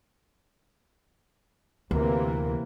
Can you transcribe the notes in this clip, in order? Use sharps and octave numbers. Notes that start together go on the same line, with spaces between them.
D2 C3 E3 A#3